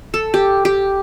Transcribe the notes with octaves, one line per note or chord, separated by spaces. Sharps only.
A4
G4
G4